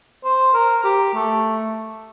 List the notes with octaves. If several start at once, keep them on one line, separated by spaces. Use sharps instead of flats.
C5
A#4
G4
A3